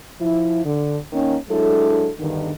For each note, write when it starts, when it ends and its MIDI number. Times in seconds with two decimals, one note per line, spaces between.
0.21 0.62 53
0.21 0.62 64
0.65 0.97 50
1.13 1.36 51
1.13 1.36 58
1.13 1.36 61
1.49 2.09 54
1.49 2.09 56
1.49 2.09 62
1.49 2.09 64
1.49 2.09 69
2.19 2.51 40
2.19 2.51 43
2.19 2.51 50
2.19 2.51 51